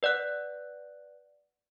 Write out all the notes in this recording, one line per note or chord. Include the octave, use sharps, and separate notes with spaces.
B4 D5 F#5 F#6